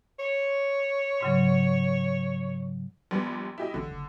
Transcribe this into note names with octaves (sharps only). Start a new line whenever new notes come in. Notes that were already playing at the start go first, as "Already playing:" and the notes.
C#5
G#2 C#3 F#3
A#1 G3 B3
E4 G4 D#5
A1 D3
F#1